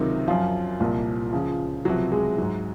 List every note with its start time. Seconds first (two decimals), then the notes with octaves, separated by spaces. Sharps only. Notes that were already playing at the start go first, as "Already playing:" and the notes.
Already playing: C#2 C3 D#3 F#3 D#4
0.28 F#2 F3 F4
0.80 C2 A#2 F3
1.33 C#2 C#3 F3
1.85 C#2 C3 F3 F#3 F#4
2.12 G#3 G#4
2.38 G#2 F#3